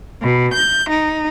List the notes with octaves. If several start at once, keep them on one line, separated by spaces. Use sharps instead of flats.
B2
G6
D#4